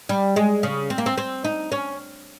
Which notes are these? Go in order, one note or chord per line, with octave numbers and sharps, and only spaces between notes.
G3
G#3
C#3
C4
A#3
C4
C4
D#4
C#4